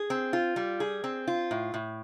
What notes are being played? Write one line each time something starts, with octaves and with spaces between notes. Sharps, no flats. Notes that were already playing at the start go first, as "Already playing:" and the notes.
Already playing: G#4
C4
F4
G3
G#4
C4
F4
A2
A2